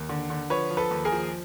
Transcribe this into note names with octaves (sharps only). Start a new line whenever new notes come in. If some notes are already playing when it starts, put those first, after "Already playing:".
Already playing: D#2
D3
D3
F3 B4 C#5
F3
A4 B4
D#2
G#4 A#4
F3